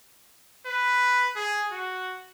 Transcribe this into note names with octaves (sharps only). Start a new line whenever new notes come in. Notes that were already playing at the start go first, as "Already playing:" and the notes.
B4
G#4
F#4